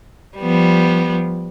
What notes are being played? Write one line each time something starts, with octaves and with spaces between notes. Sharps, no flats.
F3 G3 B3